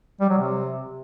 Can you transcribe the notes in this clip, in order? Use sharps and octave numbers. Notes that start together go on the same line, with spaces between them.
G3
F#3
C3